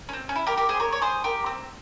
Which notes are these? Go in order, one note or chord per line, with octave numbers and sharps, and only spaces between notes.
C#4
C4
C#4
E4
G4 A#4
G4 A#4
G#4 C5
A#4 C#5
C#5
G#4 C5
G4 A#4
C4